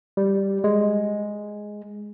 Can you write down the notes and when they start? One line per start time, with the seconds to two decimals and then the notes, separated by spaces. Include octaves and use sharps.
0.17 G3
0.64 G#3